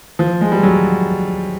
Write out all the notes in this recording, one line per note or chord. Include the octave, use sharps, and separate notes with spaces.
F3
G#3
G3
F#3